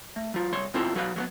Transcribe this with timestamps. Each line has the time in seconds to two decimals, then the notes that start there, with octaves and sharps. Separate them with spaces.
0.16 A3
0.34 F#3 F4
0.53 C2 C#5 C6
0.74 B2 C4 E4 F4 A4
0.94 B1 F#3 F#4 B4 F5
1.16 F#3 A3 B3